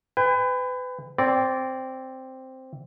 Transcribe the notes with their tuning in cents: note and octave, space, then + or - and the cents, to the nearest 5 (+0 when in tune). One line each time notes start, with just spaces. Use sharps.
B4 +30 G5 +45
C4 +0 D5 -20